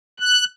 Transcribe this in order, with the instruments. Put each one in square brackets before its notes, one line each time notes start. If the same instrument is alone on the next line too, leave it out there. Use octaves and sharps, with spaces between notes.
[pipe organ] F#6